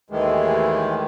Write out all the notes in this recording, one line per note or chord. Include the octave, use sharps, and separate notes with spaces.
D#2 A2 D#3 E3 G#3